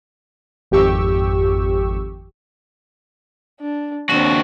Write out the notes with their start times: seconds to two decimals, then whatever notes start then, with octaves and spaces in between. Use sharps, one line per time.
0.71 G#1 F2 G4 C#6 E6
3.60 D4
4.10 D#2 C4 D4 F#4